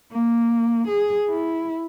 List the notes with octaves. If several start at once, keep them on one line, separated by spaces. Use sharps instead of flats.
A#3
G#4
E4